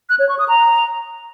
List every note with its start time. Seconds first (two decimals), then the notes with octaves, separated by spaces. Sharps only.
0.09 F#6
0.19 C#5
0.29 C#6
0.39 D#6
0.48 A#5